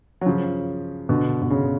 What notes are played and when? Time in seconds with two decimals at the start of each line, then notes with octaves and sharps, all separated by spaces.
0.21 F#3
0.26 C#3 F3
1.09 B2 D3
1.42 B2
1.50 C#3